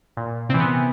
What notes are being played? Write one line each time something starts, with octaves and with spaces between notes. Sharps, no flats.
A#2
C3 E3 C4
B3